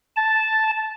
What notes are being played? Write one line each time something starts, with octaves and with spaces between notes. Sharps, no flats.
A5